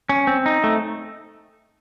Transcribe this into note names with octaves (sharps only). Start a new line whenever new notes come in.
C#4
C4
D#4
A3